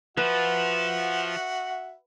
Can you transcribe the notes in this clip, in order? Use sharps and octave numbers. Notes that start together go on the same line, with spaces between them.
F3 F#4 B4 E5 F#5